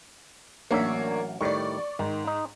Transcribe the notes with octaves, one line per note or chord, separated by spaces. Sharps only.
A1 F#3 A#3 D4 C#5 E5
A2 D#3 G3 D5 C#6
G#2 D#3
D#4